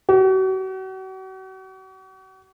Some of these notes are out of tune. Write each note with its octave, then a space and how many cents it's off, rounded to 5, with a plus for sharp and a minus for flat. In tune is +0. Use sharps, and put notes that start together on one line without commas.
F#4 +40